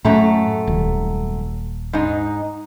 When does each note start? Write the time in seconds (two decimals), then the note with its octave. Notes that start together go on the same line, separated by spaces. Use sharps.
0.05 F#2 A2 A3 A#5
0.67 D#1
1.93 G#2 D#4